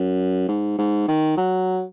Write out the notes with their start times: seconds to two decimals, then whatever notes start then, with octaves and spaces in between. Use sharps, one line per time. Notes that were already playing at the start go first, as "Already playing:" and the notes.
Already playing: F#2
0.48 G#2
0.78 G#2
1.08 D#3
1.37 F#3